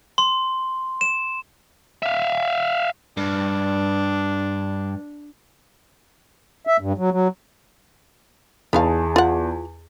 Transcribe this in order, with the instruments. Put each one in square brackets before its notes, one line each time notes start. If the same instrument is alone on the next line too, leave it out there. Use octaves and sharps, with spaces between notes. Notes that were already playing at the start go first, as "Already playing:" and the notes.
[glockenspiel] C6
E7
[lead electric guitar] E5 F5
[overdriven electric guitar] G2 [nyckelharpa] D4
[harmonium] E5
G2
F#3
F#3
[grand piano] E2 G#4 A5 [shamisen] B3 D#4 F5
[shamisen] F4 F#5